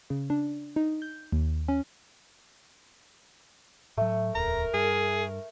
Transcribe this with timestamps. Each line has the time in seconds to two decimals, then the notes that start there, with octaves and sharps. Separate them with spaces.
0.10 C#3
0.30 D4
0.76 D#4
1.02 G6
1.32 D#2
1.68 C#4
3.97 A2 F#3 A3
4.35 D1 E2 A#4 A#5
4.74 G2 G#4